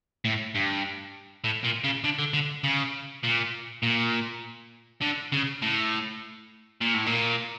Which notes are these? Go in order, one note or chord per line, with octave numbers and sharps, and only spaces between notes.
A2
G2
A2
A#2
C#3
D3
D3
D3
C#3
A#2
A#2
D3
C#3
A2
A#2
A2
A#2